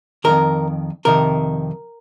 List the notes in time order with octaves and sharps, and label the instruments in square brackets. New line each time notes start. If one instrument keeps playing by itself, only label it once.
[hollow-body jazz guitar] F2 C3 D#3 A#4
F2 C3 D#3 A#4